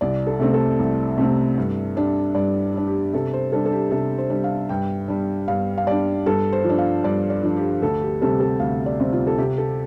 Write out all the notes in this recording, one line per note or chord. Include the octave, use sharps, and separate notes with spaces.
C2 D5
A4
C3 A3 C4
A4
C2
C3 A3 C4
G2
G3 D4
G2 D5
G3 D4
G4
C3 A4
C5
G3 D4 A4
A4
G4
C3 A4
C5
G3 D4
F5
G2 G5
G3 D4
G2 F5
F5
G3 D4 D5
G2 A4
C5
F3
D4
F5
G2 D5
D5
F3 D4
G4
D2 A4
G4
C3 G3 C4 A4
A4
D2 F5
D5
C3 G3 C4
F4
A4
C3 G4
A4